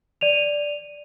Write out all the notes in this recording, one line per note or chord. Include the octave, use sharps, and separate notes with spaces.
D5 D#7 F7